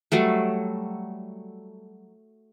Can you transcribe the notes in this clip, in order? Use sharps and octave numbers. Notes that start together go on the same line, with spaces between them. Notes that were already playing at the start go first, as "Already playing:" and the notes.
F#3 G3 A3